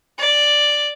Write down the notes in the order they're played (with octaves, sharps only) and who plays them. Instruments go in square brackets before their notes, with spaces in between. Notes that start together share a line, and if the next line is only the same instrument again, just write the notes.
[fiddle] D5